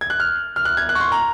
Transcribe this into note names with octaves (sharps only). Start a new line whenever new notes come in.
G#6
F#6
F6
F6
F#6
G#6
F#6
C#6
C6
A#5